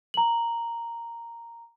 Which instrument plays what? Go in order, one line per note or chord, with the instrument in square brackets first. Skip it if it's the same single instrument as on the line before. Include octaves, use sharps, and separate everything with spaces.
[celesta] A#5 F#7